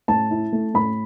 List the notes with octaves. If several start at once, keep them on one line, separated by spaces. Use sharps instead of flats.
A2 A5
E4
A3
A2 B5